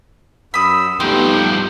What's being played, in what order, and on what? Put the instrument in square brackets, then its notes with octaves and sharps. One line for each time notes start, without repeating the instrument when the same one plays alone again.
[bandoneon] F#2 E6 [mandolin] B5 D#6
[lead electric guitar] G2 F3 [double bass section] G3 A3 B3 [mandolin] D#4 [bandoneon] G5